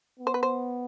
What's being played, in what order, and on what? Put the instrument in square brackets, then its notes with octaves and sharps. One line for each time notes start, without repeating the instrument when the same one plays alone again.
[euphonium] B3
[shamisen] C5
B4
C5